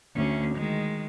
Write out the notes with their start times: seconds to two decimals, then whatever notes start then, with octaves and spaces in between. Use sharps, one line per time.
0.16 D2 C#4
0.55 D#3 G#3